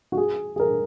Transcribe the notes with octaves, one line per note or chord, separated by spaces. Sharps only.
F#4
G#4
G#4
A#4